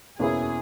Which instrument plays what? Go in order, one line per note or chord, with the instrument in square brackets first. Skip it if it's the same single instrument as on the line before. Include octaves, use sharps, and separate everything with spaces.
[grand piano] E2 B2 A#3 C#4 E4 [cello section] G#4